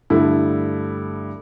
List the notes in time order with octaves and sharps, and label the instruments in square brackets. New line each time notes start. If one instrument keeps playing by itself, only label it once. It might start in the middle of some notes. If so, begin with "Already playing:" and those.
[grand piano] G2 D3 A3 E4